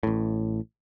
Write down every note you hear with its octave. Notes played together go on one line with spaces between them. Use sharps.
A1 A2